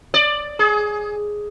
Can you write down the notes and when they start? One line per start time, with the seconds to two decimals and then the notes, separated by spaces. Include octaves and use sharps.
0.14 D5
0.59 G#4